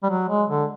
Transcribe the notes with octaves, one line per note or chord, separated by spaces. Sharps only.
G3
F#3
G#3
D3